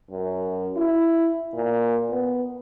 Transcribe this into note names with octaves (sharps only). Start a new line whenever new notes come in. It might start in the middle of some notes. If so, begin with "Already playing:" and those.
F#2
E4
A#2
B3